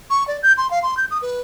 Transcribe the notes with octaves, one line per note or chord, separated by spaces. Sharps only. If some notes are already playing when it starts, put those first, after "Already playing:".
C#6
D5
G6
C6
F5
C6
G6
D#6
B4